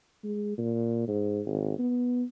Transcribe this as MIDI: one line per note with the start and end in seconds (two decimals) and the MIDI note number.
0.24 0.56 56
0.58 1.04 46
1.08 1.41 44
1.46 1.78 32
1.79 2.24 59